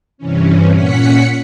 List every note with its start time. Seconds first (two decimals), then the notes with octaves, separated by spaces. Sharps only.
0.18 G2 C3 E3 C#4
0.73 A#2 C#4 F#5 B6 C#7